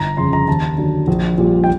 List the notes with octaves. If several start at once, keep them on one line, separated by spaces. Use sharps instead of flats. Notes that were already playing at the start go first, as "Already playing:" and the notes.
Already playing: G1 A#5
F2 C#3 C6
A#5
D#2 A5
D3 F#3
A#1
A#2 G3
G5